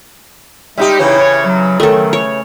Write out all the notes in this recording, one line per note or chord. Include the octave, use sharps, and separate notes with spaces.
G3 G#3 D#4 G4 E5
C#3 E3 C#4 D#4 E4
C#5
F#3
D#3 F#3 A3 A4
C#5